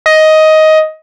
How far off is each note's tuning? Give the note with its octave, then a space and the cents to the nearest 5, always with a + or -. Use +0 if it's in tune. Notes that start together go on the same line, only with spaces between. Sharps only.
D#5 +10